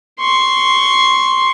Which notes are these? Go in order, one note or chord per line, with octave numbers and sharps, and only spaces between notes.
C6 C#6